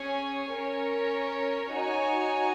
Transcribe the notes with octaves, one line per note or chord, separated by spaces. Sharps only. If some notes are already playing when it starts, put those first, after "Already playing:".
Already playing: C#4 G#4 C#5 G#5
C#4 A#4 C#5
D#4 F#4 C#5 G#5